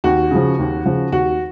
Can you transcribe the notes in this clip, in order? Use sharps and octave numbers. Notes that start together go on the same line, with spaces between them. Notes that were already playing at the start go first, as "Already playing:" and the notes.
D#2 F#4
C#3 F3
D#2
C#3 F3
D#2 F#4